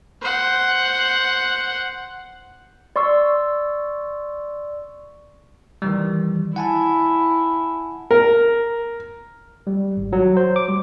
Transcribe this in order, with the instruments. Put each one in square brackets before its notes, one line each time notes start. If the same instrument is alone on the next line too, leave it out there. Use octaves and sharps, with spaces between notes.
[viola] C5 F#5
[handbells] D5 C6 C#6 E6
[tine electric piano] D#3 E3 G3
[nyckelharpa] E4 [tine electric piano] F#5 G#5 A5
[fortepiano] A#4
[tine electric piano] G3
G#1
F#3
C5
D6
G3